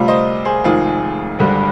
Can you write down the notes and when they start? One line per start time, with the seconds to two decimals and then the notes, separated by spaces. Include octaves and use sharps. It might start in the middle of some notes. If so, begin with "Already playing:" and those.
Already playing: D2 C3 G3 F4
0.08 C5 D#5
0.45 G#4 C5
0.64 F1 F2 D#3 G#3 F4 G#4
1.39 G#1 G2 D3 G3